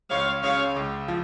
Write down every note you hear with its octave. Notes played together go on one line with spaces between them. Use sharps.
C#2 C#5 F5
C#3 C#5 F5
C#2
F3